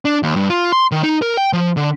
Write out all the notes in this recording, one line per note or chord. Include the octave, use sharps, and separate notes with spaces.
D4
D#2
G2
F4
C6
D#3
D#4
A#4
G5
F3
D3